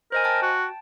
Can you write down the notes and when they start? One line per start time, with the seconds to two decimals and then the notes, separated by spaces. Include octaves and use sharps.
0.12 A#4 C5 D#5 G#5
0.24 G5 A5
0.43 F#4